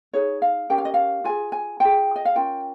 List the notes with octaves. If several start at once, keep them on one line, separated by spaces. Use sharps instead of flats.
D#4 G#4 C#5
F5
C#4 G4 A#4 G5
F5
D#5
F5
F4 G#4 G#5
G#5
F4 G#4 G5
D#5
F5
C#4 F4 A#4 G5